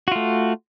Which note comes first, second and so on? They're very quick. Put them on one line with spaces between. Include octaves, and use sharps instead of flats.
F#4 F4 A3